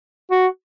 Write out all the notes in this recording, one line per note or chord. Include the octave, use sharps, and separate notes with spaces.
F#4